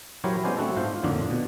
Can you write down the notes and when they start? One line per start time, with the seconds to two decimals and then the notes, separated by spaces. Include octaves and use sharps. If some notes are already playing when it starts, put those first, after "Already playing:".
0.24 F#3 E4 G4 A#4 C5 C#5
0.44 G#3 B3 C#4 C5 D5 G#5
0.57 A3 C4 D4 F#4 A4
0.77 G#2 F4 C5
1.03 F2 A2 D3 A#3 D4 A#4
1.31 B2